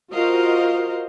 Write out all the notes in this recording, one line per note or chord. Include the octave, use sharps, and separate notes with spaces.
F4 F#4 A#4 C5 D#5 F5